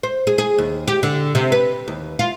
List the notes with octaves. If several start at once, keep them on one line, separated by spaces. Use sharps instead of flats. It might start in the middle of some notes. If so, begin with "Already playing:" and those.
C5
G#4
G#4
D#2
G4
D3
C3
B4
D#2
F4